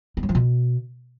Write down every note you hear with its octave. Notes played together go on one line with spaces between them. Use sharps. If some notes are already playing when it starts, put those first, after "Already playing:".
B3
F#3
F3
B2